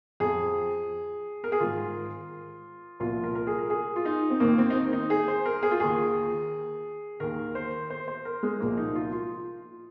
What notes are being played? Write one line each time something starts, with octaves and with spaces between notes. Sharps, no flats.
F2 F3 G#4
A#4
G#4
G#2 D#3 F4
C2 A#2 F3 F4
A#4
A#4
G#4
A#4
G#4
F4
D#4
C4
D#2 D#3 A#3
C4
D#4
C4
D#4
G#4
C5
A#4
G#4
F4
D#2 D#3 G#4
D#2 D#3 A#4
C5
C5
C5
A#4
G#3
C2 A#2 F3 A#3
D#4
F4
F4